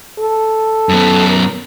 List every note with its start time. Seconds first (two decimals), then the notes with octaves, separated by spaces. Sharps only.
0.20 A4
0.89 F#2 B3
1.30 A#4